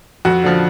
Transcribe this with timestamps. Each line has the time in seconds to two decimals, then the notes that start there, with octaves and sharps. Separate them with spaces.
0.25 F2 F#4
0.44 D3 F3